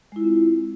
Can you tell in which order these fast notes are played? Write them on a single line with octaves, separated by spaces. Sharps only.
G#3 E4 F4 C4